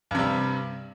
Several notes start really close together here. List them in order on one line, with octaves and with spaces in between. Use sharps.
G2 C3 G3